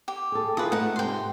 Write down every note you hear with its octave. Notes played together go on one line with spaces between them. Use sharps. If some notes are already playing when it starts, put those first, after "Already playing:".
G4
G#4 A4
E4 F4 G#4 B4 D#6
A3 D#4 B4 F#5
G#2 C3 A3 G5 C6